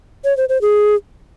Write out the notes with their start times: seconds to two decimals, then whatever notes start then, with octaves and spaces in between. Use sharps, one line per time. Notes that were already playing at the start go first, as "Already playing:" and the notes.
0.24 C#5
0.37 C5
0.49 C5
0.62 G#4